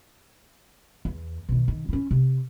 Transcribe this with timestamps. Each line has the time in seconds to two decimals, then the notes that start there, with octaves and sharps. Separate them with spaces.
1.05 E2
1.49 B2 D#3
1.68 D#3
1.89 C#4 E4
2.11 C3